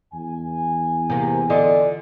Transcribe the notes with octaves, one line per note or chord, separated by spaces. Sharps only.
E2 G#5
C3 A#3
D3 F4 D#5